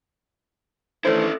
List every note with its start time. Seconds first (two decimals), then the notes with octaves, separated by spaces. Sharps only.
1.05 D#3 E3 A3 C#4 D4 E4 A4 C5